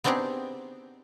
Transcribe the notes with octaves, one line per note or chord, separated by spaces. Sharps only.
B3 C4 D4 D#4 G4 G#4